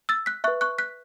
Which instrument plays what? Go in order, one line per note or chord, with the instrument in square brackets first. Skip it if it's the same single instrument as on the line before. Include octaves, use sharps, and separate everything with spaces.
[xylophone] E6 A6
F#6 B6
B4 E5 C#6 F#6
C#6 F#6
F#6 B6